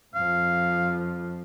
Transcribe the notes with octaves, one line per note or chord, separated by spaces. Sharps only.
F2 F3 F5